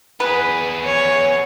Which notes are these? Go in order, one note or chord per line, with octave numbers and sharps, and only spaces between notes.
B3 G#4 B4
C#5